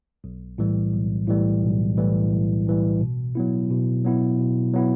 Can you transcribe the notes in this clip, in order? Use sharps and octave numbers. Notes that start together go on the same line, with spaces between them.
B1
A2 E3 G3
B1
A2 E3 G3
B1
A2 E3 G3
B1
A2 E3 G3
B2
F#3 B3 E4
B2
F#3 B3 E4
B2
F#3 B3 E4